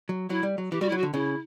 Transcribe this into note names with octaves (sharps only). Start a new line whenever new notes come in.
F#3
F#3 E4
G3
F#3
E3 G4
G3 F#4
E4
F#3 F#4
D3
C#3 E4